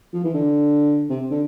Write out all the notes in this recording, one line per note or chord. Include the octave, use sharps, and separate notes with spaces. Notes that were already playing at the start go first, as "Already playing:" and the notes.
F3
E3
D3
C3
D3